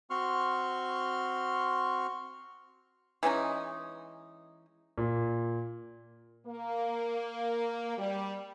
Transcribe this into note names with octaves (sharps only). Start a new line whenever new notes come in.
C4 F#4 C6 C#6 F6
E3 G#3 C#4 D#4
A#2
A#3
G3